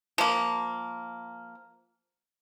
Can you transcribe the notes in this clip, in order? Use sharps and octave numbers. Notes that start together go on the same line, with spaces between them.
F3 A#3